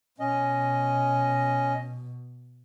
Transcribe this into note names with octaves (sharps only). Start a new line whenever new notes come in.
B2 C#4 D#5